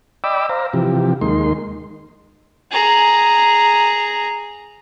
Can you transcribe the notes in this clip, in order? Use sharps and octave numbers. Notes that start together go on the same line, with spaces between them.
D5 D#5 G5 B5 D6 E6
C5 F5 A#5
C3 E3 F3 G4
D#2 G#3 A#3 D#4 C6
G#4 A#5